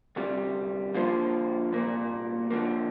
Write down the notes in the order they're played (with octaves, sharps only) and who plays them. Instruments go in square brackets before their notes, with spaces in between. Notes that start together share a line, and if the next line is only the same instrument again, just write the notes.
[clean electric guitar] D2 C3 G3
D3 F3 A#3 F4 C5
C2 A#2 A#3
D3 F3 A#3